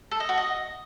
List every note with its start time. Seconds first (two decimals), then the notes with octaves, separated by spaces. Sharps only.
0.11 A4
0.20 D#5
0.29 F#4
0.37 D#5